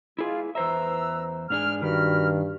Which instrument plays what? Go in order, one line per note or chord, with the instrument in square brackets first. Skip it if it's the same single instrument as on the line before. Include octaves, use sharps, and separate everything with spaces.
[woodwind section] G#3 F4 [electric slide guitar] E4 G#4
[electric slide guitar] E2 C5 E5 [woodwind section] B4 A#5 E6
[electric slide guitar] G#2 D4 G#4 [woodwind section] F6
[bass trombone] G2 [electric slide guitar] D#3 [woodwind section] F#4 B5 F6